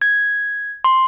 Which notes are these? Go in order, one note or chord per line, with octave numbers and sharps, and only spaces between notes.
G#6
C6